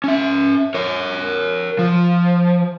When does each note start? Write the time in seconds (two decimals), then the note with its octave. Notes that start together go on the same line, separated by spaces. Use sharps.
0.04 C#4 E5
0.75 A#4 C#5
1.79 F3